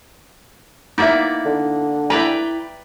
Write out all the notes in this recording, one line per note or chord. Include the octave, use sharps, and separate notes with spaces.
A#3 B3 D#4 E4 D5 E5
D3
E4 B4 D5 G5 A#5